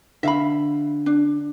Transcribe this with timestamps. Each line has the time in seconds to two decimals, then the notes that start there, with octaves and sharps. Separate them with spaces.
0.23 D3 E5 F5 B5
1.06 D4